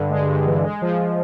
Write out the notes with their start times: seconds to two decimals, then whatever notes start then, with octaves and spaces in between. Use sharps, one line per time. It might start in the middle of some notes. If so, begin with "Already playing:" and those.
Already playing: G2 D3
0.10 G#3
0.28 G2
0.46 E3
0.64 G#3
0.82 F3